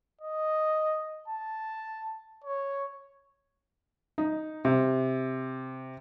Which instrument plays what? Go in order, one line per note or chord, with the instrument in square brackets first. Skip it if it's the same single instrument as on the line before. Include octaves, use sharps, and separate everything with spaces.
[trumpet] D#5
A5
C#5
[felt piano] D#4
C3